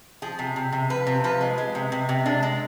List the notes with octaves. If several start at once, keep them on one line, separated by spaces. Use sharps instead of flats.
F3 G#4
C3
C3
C3
F3 B4
C3
F3 B4
G#3
G#3
C3
C3
C3
G#3 D4
G#3